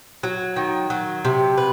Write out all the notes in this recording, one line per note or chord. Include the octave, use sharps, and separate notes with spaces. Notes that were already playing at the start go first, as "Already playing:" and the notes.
F#3
D#3
F#3
C3
B4